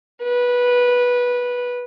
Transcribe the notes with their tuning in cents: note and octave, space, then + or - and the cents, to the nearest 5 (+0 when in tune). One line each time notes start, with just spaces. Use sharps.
B4 -15